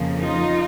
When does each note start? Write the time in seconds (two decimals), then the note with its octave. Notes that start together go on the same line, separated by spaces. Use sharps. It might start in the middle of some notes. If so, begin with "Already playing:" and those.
Already playing: F2 C#3 F3 A#3
0.19 D#4 F4